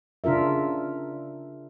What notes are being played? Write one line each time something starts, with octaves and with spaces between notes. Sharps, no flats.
C#3 D4 F4 A#4 E5